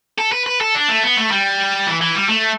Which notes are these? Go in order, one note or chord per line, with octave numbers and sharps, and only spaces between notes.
A4
B4
B4
A4
D4
A3
B3
A3
G3
E3
E3
G3
A3